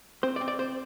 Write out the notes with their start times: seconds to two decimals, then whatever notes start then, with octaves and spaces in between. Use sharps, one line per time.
0.23 C4 C5
0.36 D5
0.41 C4
0.48 D5
0.59 C5